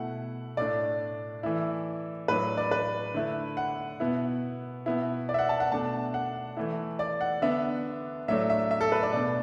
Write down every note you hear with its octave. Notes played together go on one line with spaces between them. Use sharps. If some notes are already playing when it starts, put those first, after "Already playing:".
Already playing: B2 A3 E4 F#5
A2 A3 D4 D5
E3 A3 E4
A2 F#3 D4 B4
D5
B4
D3 A3 E4
F#5
B2 B3 E4
B2 B3 E4
D5
E5
F#5
A5
F#5
B2 A3 D4 A5
F#5
E3 A3 E4
D5
F#5
D3 B3 D4 E5
A2 F#3 A3 D4 E5
E5
E5
A4
B4
D5
B2 A3 D4 D5